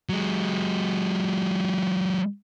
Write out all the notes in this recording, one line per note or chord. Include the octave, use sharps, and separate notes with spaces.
F#3 G#3